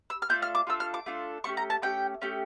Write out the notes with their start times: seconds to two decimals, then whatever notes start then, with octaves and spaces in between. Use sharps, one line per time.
0.10 E6
0.22 F6
0.29 A3 D4 F4 A4 G6
0.42 F6
0.55 D6
0.67 A3 D4 F4 A4 E6
0.80 F6
0.94 D6
1.06 A3 D4 F4 A4
1.44 A3 C#4 G4 C#6
1.57 A#5
1.70 A5
1.82 A3 C#4 G4 G5
2.22 A3 C#4 G4